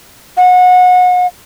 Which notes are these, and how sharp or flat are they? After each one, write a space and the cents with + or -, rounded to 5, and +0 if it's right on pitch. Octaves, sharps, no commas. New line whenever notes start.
F#5 -30